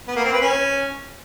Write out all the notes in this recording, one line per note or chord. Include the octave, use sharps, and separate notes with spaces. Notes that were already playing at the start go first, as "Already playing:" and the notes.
B3
A#3
C4
B4
C#4